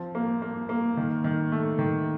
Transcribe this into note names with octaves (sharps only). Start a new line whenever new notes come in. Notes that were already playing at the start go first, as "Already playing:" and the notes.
Already playing: F3 C4
A#3
A#3
A#3
D#3
D#3
A3
D#3